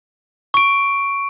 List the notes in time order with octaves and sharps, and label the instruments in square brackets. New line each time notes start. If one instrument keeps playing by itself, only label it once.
[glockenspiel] C#6 D7